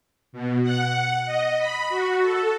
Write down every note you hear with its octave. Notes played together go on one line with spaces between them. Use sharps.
B2
F#5
D#5
B5
F#4
A4